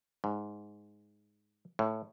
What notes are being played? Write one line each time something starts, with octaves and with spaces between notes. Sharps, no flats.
G#2
A2